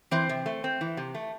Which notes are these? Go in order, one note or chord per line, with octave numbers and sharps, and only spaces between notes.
E3 C4 C5
C3
A3
C4
E3
C3
A3